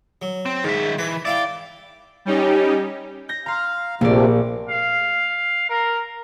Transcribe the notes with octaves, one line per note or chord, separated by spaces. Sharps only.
F#3
C4
G#2 D#3 E5
E3 B4
E4 D5 F5 G5
G3 C#4 D#4 G4
G6 A#6
F5 A#5 C6
A#1 C3 F3 A3 A#3 D5
F5
A#4